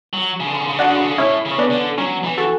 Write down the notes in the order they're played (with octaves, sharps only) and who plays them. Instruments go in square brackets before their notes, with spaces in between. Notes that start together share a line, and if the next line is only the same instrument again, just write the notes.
[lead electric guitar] F#3
C#3
D3
C#3
D3
C#3
D3
[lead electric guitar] C#3 [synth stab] D4 F#4
[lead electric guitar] D3
C#3
D3
C#3
[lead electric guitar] A2 [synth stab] C#4 E4
[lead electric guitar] C#3
[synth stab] C#4
B3 D4
[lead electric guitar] D3
[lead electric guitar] F#3 [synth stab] C#4
[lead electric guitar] E3
[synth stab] F#4 A4